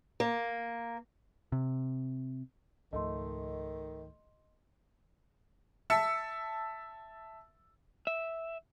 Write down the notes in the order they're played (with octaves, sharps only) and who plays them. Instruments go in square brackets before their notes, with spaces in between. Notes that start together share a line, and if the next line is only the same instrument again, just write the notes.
[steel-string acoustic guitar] A#3
[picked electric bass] C3
[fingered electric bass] C#2 G#2 F3 [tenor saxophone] D#3 [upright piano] A3 [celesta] D#5 C6
[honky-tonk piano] E5 A5 E6 C#7
[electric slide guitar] E5